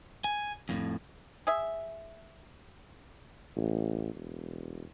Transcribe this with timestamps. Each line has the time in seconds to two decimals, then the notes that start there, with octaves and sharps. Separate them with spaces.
0.24 G#5
0.69 F2 A2
1.47 G#4 E5
3.56 A1
4.14 E1